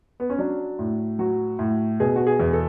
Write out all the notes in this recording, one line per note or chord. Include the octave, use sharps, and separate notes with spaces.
B3
C#4
F#3 D4
A2
F#3 F#4
A2
B2 G#4
F#4
G#4
E2
A4